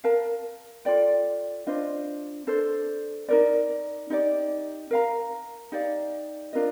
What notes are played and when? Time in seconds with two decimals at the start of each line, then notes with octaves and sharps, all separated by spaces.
0.04 A#4 F5 A5
0.85 F4 A4 D5 G5
1.67 D4 F4 C5 D#5
2.47 D4 A4 C5
3.28 D#4 A#4 D5
4.10 D#4 G4 D5
4.91 A#4 F5 A#5
5.72 D#4 G4 D5 F5
6.53 D4 F4 A#4 D#5